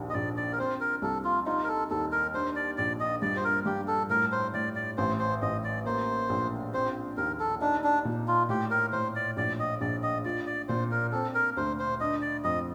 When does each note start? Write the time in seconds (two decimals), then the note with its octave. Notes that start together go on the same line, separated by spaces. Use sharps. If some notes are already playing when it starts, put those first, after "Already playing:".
Already playing: A#1 D#2
0.10 D#5
0.14 A#1 D5
0.37 D5
0.53 A#4
0.59 C4 C5
0.80 A#4
1.02 C2 A4
1.24 F4
1.46 D#4 F4
1.64 A#4
1.69 A4
1.90 D#2 A4
2.12 A#4
2.34 D4 C5
2.56 D5
2.78 A#1 D5
3.00 D#5
3.22 G2 D5
3.36 C5
3.44 A#4
3.66 G2 G4
3.88 A4
4.10 A2 A#4
4.32 C5
4.54 A2 D5
4.75 D5
4.98 A1 C5
5.19 C5
5.42 A1 D#5
5.64 D5
5.86 A#3 C5
6.29 A#1
6.73 C4 C5
7.17 D#2 A#4
7.40 A4
7.61 D4 D#4
7.84 D4
8.05 A#2
8.28 F4
8.49 A2 G4
8.71 A#4
8.92 A2 C5
9.16 D5
9.37 A#1 D5
9.60 D#5
9.81 A#1 D5
10.03 D#5
10.25 F4 D5
10.47 D5
10.69 A#2 C5
10.91 A#4
11.12 C4 A4
11.34 A#4
11.57 D2 C5
11.79 C5
12.00 D4 D#5
12.22 D5
12.44 F2 D#5